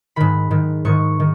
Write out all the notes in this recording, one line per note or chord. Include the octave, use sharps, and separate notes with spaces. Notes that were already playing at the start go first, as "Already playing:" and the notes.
G#2 D#3 B5
G#2 D#3
G#2 D#3 C#6
D#3